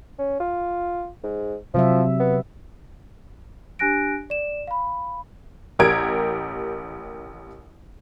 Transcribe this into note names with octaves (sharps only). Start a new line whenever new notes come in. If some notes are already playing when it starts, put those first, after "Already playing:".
C#4
F4
G#2
C3 F3 F#3 E5
B3
D4 G4 G#5 F#6 A#6 D7
D5 E7
F5 B5
A1 G4 A#4 G#6 D7